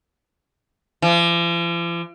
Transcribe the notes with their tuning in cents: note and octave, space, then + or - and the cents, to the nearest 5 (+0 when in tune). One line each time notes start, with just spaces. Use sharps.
F3 -45